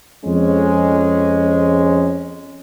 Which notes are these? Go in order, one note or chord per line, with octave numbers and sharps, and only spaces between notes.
F2 G#3 C#4